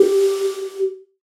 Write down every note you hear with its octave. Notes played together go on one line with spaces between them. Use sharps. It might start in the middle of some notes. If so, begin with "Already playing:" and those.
Already playing: G4